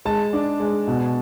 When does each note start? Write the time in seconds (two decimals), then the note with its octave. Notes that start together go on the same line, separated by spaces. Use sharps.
0.05 G#3 A5
0.33 D4
0.60 G#3
0.88 B2